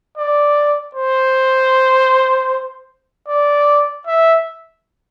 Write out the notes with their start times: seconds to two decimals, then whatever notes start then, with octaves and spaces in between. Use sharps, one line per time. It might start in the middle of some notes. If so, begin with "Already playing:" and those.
0.17 D5
0.95 C5
3.28 D5
4.07 E5